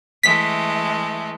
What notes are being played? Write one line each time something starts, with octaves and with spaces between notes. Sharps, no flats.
E3 G#3 A3 B6